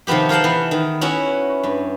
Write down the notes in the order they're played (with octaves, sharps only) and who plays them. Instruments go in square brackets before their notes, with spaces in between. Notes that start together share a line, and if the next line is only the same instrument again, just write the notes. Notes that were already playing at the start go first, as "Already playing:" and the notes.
[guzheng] C3 D#3 F3 B3 G4
F4 A#4 C5 F#5 A5
E3 B3
D#3
B3 C#4 E4 F#4
G2